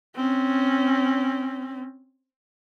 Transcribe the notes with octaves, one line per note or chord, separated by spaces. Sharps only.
C4 C#4